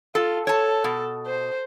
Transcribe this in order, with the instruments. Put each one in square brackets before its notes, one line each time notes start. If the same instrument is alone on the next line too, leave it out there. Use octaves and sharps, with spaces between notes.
[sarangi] F4 [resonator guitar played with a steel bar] A4
[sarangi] A4 [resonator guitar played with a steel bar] C#5 A5
[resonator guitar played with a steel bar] B2
[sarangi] C5